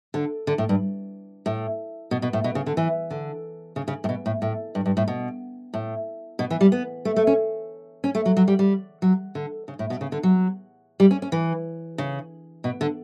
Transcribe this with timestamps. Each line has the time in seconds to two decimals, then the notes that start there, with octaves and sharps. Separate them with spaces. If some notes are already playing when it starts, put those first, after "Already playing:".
0.14 D3
0.47 D3
0.58 A2
0.69 G2
1.46 A2
2.11 B2
2.22 B2
2.33 A2
2.44 B2
2.55 C#3
2.66 D3
2.77 E3
3.10 D3
3.76 C#3
3.88 C#3
4.04 A2
4.09 B2
4.26 A2
4.42 A2
4.75 G2
4.86 G2
4.97 A2
5.08 B2
5.74 A2
6.39 B2
6.50 E3
6.61 G3
6.72 B3
7.05 A3
7.16 A3
7.27 C#4
8.04 C#4
8.15 A3
8.26 F#3
8.37 F#3
8.48 G3
8.59 G3
9.02 F#3
9.35 D3
9.68 C#3
9.79 A2
9.90 B2
10.01 C#3
10.12 D3
10.23 F#3
11.00 G3
11.11 C#4
11.22 C#4
11.32 E3
11.98 C#3
12.64 B2
12.81 D3